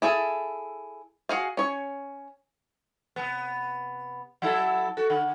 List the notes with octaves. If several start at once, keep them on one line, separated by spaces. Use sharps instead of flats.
E4 G#4 A4
F#4 G#4 F5
C#4 C#5
C3 B3
F#3 E4 A4 F#5
F#4 A4
D3 F#5